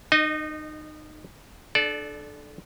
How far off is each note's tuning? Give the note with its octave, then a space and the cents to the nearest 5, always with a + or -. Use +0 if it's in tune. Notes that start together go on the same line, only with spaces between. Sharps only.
D#4 -25 D#5 +0
D4 +25 A4 -25 D5 +0